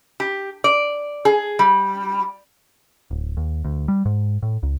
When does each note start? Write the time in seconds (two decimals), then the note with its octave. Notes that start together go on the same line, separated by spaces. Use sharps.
0.20 G4
0.64 D5
1.25 G#4
1.59 G3
3.11 D1
3.37 D#2
3.64 D2
3.88 G3
4.05 G#2
4.43 A2
4.63 C#2